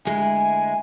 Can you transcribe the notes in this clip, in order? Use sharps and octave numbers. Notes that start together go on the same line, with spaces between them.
D2 G#3 E4 G#5